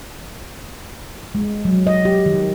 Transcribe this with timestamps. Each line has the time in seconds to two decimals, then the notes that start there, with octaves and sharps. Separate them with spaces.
1.35 G#3
1.65 F#3
1.87 D#5
2.05 G4
2.26 D#3